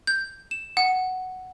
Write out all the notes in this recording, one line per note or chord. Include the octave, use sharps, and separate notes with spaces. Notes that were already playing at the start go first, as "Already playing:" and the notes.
G6
E7
F#5